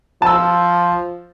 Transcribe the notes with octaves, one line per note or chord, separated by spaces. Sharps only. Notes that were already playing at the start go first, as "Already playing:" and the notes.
F3 A5 E6